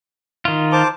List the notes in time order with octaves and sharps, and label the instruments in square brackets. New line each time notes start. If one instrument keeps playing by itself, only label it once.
[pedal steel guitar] D#3 F4
[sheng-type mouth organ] C5 A5 D6